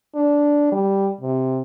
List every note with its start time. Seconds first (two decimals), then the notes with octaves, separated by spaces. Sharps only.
0.15 D4
0.72 G3
1.21 C3